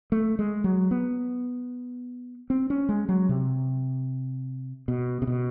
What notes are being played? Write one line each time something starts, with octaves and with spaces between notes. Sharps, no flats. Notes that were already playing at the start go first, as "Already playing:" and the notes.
A3
G#3
F#3
B3
C4
C#4
G#3
F#3
C3
B2
C3
B2